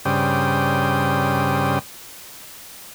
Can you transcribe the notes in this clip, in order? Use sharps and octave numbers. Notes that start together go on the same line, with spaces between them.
G2 C#3 C5 D5 G5 D#6